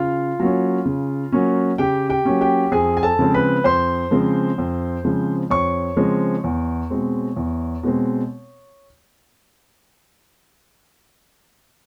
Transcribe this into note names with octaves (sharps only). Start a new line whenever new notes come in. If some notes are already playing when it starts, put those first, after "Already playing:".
Already playing: C#3 F4 F5
F#3 A#3 C#4
C#3
F#3 A#3 C#4
C#3 G4 G5
G4 G5
F#3 A#3 C#4
G4 G5
F2 G#4 G#5
G#5
A4 A5
C#3 F3 G#3 C4
B4 B5
F2 C5 C6
C#3 F3 G#3 C4
F2
C#3 F3 G#3 C4
F2 C#5 C#6
C#3 F3 G#3 C4
E2
B2 G#3 C4
E2
B2 G#3 C4